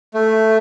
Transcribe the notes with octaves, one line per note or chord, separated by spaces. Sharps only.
A3